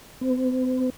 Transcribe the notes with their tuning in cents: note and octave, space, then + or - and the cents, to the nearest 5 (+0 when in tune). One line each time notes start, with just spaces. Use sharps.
C4 -40